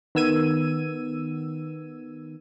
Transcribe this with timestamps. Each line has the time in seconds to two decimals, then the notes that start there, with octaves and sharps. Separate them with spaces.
0.15 D#3 B3 E6 G#6 D#7